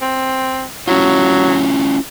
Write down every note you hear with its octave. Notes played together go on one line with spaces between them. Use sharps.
C4
F#3 C#4 E4 F4